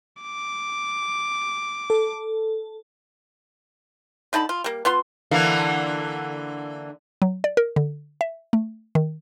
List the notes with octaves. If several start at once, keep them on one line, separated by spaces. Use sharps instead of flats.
D6
A4
D3 D#4 A5 B5
F4
G3 A#3
B3 F4 C6
D3 E3 A#3
F#3
D5
A#4
D3
E5
A3
D#3